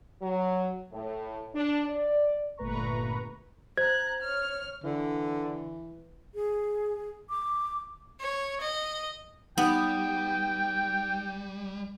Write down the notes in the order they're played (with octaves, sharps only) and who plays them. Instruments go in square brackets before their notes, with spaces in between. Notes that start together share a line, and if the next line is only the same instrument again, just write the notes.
[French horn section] F#3
A2
D4
D5
[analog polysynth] G1 A#2 A3 B4 A#5 C#6
[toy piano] C5 [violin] A#5 F#6 [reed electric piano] G#6
[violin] C#5 F6
[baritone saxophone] D3 [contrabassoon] E3
[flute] G#4
D6
[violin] C#5
D#5
[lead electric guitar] G3 [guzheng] B3 [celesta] D#4 D#6 [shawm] G5